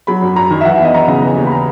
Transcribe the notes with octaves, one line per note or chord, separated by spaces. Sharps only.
F#3 B5
F#2
F#2 A#5
D#3
E5
E3 F#5
E2 E5
D#5
E2 A#5
C#3
E3
D#2
B5
A#5